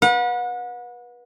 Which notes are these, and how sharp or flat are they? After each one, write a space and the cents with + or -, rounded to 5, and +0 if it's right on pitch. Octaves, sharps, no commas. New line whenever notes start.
B4 -25 F#5 -35